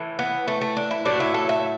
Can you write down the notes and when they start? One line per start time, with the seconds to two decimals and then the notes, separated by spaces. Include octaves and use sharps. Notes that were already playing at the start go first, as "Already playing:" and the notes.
Already playing: A2 E3
0.19 B3
0.48 A3
0.61 A3
0.77 D4
0.91 E4
1.05 A2 F#3 A3 D4
1.20 E4
1.34 A4
1.49 E5